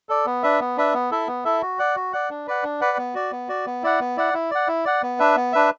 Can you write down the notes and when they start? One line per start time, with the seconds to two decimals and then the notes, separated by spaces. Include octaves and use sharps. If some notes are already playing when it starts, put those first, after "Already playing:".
0.09 A4 D5
0.26 B3
0.43 D4 B4 E5
0.60 B3
0.77 D4 B4 E5
0.94 B3
1.11 E4 A4 E5
1.27 B3
1.45 E4 A4 E5
1.62 F#4
1.79 D5 F#5
1.96 F#4
2.13 D5 F#5
2.30 D4
2.47 B4 D5 F#5
2.64 D4
2.81 B4 D5 F#5
2.98 B3
3.14 F#4 D5
3.32 B3
3.48 F#4 D5
3.66 B3
3.83 E4 D5 F#5
4.00 B3
4.17 E4 D5 F#5
4.34 E4
4.51 D5 F#5
4.68 E4
4.85 D5 F#5
5.03 B3
5.19 D4 B4 E5
5.36 B3
5.53 D4 B4 E5